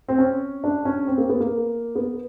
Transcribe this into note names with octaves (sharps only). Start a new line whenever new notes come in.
C4
C#4
D4
C#4
C4
A#3
B3
A#3
B3